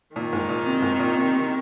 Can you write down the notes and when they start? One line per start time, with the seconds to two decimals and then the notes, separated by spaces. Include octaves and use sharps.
0.16 A#2 D#3
0.33 G#2
0.49 A#2
0.66 C3
0.82 G#2
0.99 A#2
1.16 C3
1.33 C3